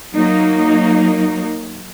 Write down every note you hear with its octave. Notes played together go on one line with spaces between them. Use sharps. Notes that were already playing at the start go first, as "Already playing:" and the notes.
F#3 A#3 D#4